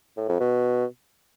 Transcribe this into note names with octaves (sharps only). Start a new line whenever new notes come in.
A2
F2
B2